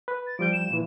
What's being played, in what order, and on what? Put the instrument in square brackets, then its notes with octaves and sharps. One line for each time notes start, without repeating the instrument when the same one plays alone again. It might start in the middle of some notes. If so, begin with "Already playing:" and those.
[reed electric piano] B4
[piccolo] A6
[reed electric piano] F3 G3 G6 [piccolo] D7
[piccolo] E7
[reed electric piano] A#2 E3